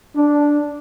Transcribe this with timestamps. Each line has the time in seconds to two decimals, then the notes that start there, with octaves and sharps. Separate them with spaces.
0.16 D4